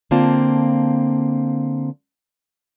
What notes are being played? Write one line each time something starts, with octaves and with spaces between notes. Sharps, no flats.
D3 A#3 C4 F4 A5